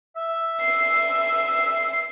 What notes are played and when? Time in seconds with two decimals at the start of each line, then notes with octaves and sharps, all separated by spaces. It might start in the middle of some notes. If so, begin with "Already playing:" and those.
0.16 E5
0.61 C7